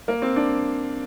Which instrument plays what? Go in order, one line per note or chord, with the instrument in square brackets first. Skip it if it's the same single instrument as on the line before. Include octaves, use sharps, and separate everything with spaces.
[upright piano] A#3
C4
D4